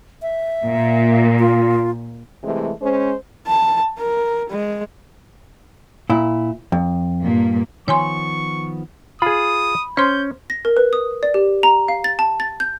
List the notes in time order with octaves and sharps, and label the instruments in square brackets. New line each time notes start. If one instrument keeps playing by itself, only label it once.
[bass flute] E5
[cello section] A#2
[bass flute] F4
[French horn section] C3 E3 G#3 A3
G#3 C#4 C5
[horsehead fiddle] A5
A#4
G#3
[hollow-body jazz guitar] A#2 E4
F2
[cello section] G2 A#2 A#3
[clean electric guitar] D#3 F3 B3 [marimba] C#5 G#5 C6 [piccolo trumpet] C#6
[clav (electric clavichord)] F4 G#4 [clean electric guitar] B5 [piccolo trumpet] D#6
[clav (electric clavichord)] C#4 [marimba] C5 C6 [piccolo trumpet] G6
[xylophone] A#6
A#4
B4
D#6
D5
G4
A#5
F5
A6
A5
A6
G6